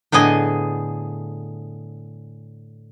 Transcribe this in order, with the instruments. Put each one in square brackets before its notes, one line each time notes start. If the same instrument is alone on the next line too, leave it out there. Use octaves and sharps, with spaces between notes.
[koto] A2 D3 B3 G#4 D#5